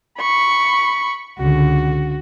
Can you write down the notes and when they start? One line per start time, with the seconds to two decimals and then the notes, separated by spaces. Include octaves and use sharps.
0.18 B5 C#6
1.39 C#2 D3 F#4